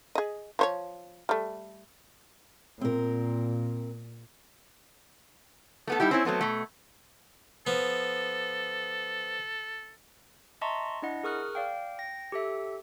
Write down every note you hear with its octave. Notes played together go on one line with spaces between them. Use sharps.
G#4 D#5
F3 C5 C#5
G3 A3
A#2 C4 A#4
A3 B3 A4
G3 D#4 E4 G4
C4 C#4 E4
F#3 A3 B3 C4
B2 A3
F3 B3 A4
D#5 E5 A5 A#5 C6 C#6
D4 E4 D#5 F#5
G#4 A#4 C#6 D#6 F6 F#6
D5 F5 G5
G5 A#6
G4 A4 E5